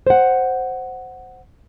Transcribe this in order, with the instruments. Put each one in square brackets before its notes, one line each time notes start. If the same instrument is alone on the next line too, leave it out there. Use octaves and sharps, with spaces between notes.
[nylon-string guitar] C5 F#5